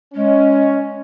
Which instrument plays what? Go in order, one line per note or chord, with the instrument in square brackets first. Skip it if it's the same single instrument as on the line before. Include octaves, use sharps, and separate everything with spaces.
[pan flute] G#3 [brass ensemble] C#4